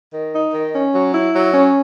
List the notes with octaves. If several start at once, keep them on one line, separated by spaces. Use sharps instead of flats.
D#3
D#4
D#3
C#4
F#3
E4
F#3
C#4